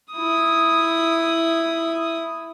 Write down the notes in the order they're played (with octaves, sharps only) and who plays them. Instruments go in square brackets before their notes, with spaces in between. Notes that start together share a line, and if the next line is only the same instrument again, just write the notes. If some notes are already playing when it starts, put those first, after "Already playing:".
[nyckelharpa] E4 D#6